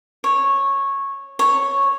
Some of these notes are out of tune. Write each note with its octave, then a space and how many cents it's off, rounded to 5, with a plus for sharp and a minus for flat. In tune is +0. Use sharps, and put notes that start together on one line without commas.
C#5 -10
C#5 -5